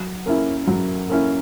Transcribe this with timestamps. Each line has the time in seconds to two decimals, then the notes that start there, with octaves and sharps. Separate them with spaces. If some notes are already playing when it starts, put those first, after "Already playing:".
Already playing: F#3
0.26 A#3 C#4 E4
0.67 F#3
1.10 A#3 C#4 E4